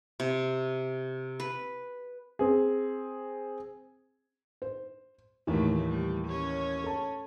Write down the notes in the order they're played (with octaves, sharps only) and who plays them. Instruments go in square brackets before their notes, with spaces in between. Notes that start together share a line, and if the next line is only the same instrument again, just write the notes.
[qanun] C3
B4
[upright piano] C4 G#4
[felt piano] C5
[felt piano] D#2 E3 [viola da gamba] A2 F#3 A3
[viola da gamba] G3
C#4 C#5
[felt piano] A4 A5